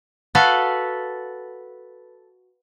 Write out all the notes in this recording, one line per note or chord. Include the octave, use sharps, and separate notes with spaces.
F#4 A4 B4 F5